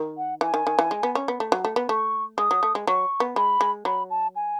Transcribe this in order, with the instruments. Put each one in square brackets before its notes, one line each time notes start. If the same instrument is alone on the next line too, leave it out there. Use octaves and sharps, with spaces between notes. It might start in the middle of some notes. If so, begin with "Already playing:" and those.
Already playing: [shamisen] D#3
[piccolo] F#5
[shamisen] E3 [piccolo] G#5
[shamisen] D#3
D#3
E3
G#3
B3
C#4
B3
A3
F#3
A3
B3
[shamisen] A3 [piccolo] C#6
[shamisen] G#3 [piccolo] D#6
[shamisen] F#3
A3
G#3
[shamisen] F#3 [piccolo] C#6
[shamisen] B3
[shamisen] G#3 [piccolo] B5
[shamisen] G#3
[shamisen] F#3 [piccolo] B5
[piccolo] A5
G#5